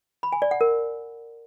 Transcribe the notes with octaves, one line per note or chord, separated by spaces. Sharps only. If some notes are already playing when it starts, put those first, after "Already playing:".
B5
G#5
D5
F#5
A#4